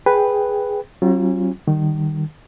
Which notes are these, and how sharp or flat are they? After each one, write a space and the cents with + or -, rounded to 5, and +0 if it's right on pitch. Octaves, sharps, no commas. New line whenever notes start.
G#4 +0 B4 +0 G5 +0
F#3 +35 C#4 -40 F4 +0
D#3 -20 G3 -10